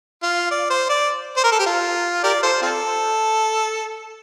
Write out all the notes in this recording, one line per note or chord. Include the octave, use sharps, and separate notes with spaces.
F4
D5
C5
D5
C5
A#4
A4
G4
F4
G4 A#4 D5
F4 A4 C5
C4 F4 A4